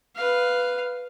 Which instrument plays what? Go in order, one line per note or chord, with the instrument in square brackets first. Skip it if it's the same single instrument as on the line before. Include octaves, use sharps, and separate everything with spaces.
[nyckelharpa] B4 F5